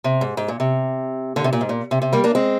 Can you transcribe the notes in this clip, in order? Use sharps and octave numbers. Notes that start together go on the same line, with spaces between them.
C3
G#2
G#2
A#2
C3
A#2 D3
C3
A#2
G#2
A#2
C3
C3
G3 A#3
A#3 D4
G#3 C4